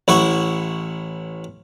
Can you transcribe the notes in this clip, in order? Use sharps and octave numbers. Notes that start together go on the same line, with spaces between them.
A1 E4 F#5 C#6